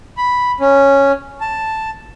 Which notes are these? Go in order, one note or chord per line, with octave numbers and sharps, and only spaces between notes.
B5
C#4
A5